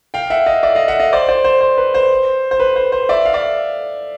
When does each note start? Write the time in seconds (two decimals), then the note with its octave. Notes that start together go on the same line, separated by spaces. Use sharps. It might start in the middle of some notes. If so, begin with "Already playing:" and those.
0.14 F5 G5
0.30 E5 F#5
0.46 D#5 F5
0.63 D5 E5
0.75 D#5 F5
0.88 E5 F#5
1.00 D#5 F5
1.13 C5 D5
1.28 C5 D5
1.45 C5
1.61 C5
1.78 B4
1.94 C5
2.51 C5
2.60 B4
2.76 C5
2.92 C5
3.09 D5 E5
3.25 F5
3.33 D5 E5